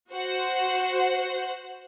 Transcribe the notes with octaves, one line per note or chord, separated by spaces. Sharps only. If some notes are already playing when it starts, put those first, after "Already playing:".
F#4 C5 F#5